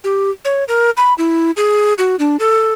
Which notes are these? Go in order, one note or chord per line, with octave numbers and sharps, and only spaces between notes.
G4
C#5
A#4
B5
E4
G#4
F#4
D4
A4